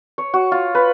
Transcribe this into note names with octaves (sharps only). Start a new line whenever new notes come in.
C#5
F#4
F4
B4